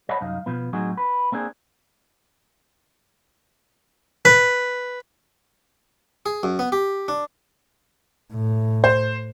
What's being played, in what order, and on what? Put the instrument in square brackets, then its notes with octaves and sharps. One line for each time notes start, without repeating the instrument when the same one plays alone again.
[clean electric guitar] C5 C#5 D#5 F#5 A5 B5
C2 F#2 D#4 F5
B2 F3 B3
A2 F#3 C4 D#4 F#4 G#4
B4
A#3 C4 D4 G#4
[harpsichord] B4
G#4
F#2
B3
G4
D4
[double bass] A2
[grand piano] C5